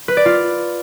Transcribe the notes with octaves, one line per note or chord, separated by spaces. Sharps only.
B4
D5
F4